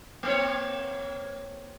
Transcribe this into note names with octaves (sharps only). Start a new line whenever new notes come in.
A#3 C4 C#5